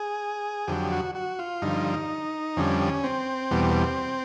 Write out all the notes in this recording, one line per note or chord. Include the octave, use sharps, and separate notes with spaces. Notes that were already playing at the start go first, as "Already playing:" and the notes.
Already playing: G#4
F2 D3 F#3 G4
F#4
F#4
F4
G2 D3 F3 D#4
F2 D3 G3 C#4
C4
E2 B2 G3